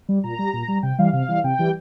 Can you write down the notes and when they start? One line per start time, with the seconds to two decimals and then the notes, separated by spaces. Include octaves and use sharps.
0.09 G3
0.24 A#2 A#5
0.39 G3
0.53 A#2
0.68 G3
0.83 C3 G5
0.98 E3 G3 F5
1.13 C3 F5
1.28 E3 G3
1.44 C3 G5
1.59 E3 G3